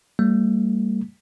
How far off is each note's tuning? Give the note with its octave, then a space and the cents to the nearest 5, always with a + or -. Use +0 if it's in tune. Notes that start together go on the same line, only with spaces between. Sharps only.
G3 +0 A#3 -45